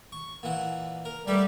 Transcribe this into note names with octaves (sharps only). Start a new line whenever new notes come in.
C#6
A#2 E3 F#5
A#4
F#3 G3 A3 B4